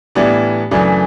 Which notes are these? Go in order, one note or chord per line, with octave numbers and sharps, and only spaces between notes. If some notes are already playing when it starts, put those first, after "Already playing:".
A2 E3 G3 B3 D4
F#2 C#3 E3 A3 D4